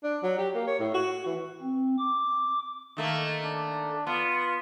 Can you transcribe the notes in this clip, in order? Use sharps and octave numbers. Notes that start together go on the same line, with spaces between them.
D4
F#3
G4
A#3
C#5
A2
F#4
E3
C4
D6
D#3 A3 A#3
D4
B3 F4